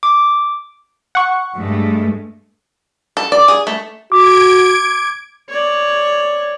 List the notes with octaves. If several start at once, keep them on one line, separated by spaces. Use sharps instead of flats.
D6
F#5 C#6
G2 G#3 A3
A4
D5
G#4
A3
F#4 D6 G#6 D7
C#5 D5